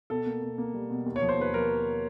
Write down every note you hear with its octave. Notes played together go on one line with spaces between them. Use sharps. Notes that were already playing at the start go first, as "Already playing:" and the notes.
B2 A4
A#3
B2
A#3
G3
B2
D#2
C#5
F3
C5
D#2 B4
F3 A#4